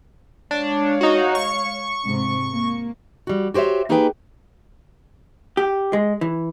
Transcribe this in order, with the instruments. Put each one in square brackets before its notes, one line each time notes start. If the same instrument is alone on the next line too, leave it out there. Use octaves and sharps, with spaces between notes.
[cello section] G#3 C#5 F5 [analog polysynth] D4
[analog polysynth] D#4 F#4
C#6
[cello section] G#2 C3
A#3
[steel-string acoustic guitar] G3 F#4
F#4 G4 C5 C#5 E5
A#3 D#4 G4 G#4 B4 G5
[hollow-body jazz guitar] G4
G#3
E3